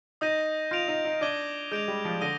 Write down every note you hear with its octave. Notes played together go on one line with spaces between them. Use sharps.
D#4 D#6 G6 A#6 D#7
F4 G6 D7 F7
D#4
D#4
D4 D6 G#6 D#7 G7
G#3 G6 D7 F7
G3
F3
D3 D#6 A#6 D#7 G7